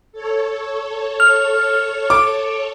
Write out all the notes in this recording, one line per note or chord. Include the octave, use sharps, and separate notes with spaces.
A4 C#5
F6
D6